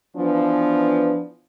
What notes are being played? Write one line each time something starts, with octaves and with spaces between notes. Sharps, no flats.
E3 F3 B3 D4